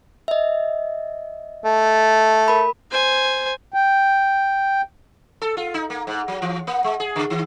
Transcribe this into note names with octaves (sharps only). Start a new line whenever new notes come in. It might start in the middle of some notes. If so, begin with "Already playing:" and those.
D#5 E5
A3
A#4 B5
C5 G#5
G5
A4
F4
D#4
A#3
G#2
F#3
E3
A#3
G#3
G#4
C#3
D#3